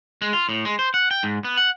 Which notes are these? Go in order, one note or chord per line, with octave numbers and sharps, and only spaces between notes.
G#3
F4
A2
G#3
C5
F#5
G5
G#2
B3
F#5